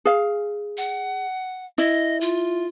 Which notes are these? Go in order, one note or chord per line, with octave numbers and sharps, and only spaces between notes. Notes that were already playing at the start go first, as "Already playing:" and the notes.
G#4 F5
F#5
E4 D#5
F4